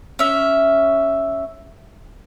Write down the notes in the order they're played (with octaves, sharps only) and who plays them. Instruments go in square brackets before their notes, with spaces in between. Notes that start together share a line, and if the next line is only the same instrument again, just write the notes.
[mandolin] C#4 E5